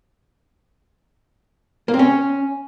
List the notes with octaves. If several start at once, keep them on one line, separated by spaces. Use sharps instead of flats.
A#3
C4
C#4